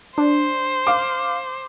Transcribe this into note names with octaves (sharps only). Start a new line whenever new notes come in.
D4 C5
F5 D6